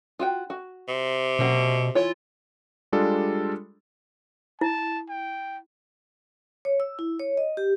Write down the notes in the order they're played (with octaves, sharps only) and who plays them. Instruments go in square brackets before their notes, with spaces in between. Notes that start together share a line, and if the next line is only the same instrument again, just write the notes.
[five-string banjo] F4 F#4 G5
F#4
[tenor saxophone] C3
[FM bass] B2 [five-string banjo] F#3 A#3 C#4
[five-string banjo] E3 E4 C#5 [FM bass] F4
[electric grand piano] G3 G#3 D4 F4 A4
[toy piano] E4 [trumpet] A5
[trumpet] G5
[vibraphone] C#5
E6
E4
C#5
D#5
G4